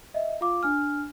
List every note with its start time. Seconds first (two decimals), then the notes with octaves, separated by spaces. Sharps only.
0.14 D#5 E5
0.41 F4 F5 D6
0.63 D4 G#5 F6